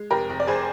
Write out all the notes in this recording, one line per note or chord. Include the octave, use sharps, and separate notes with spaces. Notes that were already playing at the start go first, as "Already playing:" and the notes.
Already playing: G#3
F1 G4 A#4
F1
D5
F1 G#4 C5